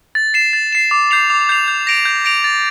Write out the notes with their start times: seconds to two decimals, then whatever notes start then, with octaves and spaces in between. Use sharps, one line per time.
0.15 A6
0.34 C7 E7
0.53 A6
0.73 C7 E7
0.91 D6
1.11 G6 C7 F7
1.30 D6
1.49 G6 C7 F7
1.68 G6
1.87 A#6 D7 F7
2.05 G6
2.25 A#6 D7 F7
2.44 A6